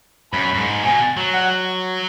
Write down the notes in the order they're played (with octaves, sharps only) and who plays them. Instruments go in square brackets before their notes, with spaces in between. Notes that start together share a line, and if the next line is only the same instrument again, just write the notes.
[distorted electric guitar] F#2 [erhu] B5
[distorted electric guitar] F#2
G#2
[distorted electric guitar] B2 [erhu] G#5
[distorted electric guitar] F#3
[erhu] F#5